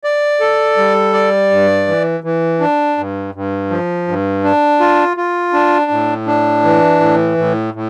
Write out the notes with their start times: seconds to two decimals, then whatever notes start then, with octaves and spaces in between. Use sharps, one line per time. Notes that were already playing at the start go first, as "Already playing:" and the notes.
0.04 D5
0.40 A4
0.77 G3
1.13 D5
1.51 G2
1.87 E3
2.24 E3
2.60 D4
2.98 G2
3.35 G2
3.70 F3
4.08 G2
4.44 D4
4.80 F4
5.17 F4
5.54 D4
5.91 A2
6.27 D4
6.64 E3
7.00 A2
7.38 A2
7.74 A2